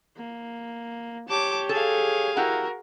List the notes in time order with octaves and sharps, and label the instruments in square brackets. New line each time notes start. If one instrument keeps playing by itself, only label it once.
[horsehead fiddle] A#3
[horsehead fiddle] G4 C#5 [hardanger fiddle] A5 D6
[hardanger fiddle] G#4 F5 [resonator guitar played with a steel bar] A4
[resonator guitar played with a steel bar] E4 G4 F#5 [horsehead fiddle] F#4 A#4